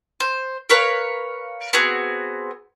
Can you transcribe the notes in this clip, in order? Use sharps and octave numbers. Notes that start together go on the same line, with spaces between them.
C5
A#4 B4 C#5 F5
B3 C4 F#4 G#4